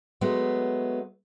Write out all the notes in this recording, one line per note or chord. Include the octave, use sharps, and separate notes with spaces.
F#3 G#3 A3 B3